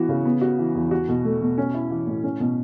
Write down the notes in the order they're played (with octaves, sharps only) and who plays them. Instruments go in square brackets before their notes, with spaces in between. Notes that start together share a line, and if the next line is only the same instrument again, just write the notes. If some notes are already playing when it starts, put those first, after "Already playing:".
Already playing: [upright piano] E3 B3 F#4
C#3
B3
F#4
E3
E2
F#4
B2
A3
B2
C#4
E4
E3
A2
C#4
B2